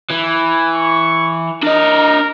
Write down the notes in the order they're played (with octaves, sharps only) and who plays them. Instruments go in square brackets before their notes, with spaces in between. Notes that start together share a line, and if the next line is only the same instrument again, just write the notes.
[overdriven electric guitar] E3
[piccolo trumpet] C#6
[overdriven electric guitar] D4 D#5 [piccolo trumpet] A#4